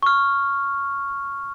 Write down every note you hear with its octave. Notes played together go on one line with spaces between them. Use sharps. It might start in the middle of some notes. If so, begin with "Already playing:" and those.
C#6 F6